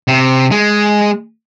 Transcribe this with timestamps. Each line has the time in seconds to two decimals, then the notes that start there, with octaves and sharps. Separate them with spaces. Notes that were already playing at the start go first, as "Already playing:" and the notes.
0.08 C3
0.52 G#3